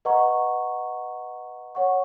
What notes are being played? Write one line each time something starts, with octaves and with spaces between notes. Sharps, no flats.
B4 D#5 F#5 A#5 C#6
C#5 F#5 C#6